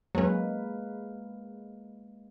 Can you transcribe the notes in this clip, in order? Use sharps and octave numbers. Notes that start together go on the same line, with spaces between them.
F#3 G#3 A#3 C#4 B4